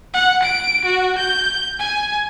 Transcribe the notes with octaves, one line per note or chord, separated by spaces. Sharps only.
F#5
D7
F#4
G6
G#5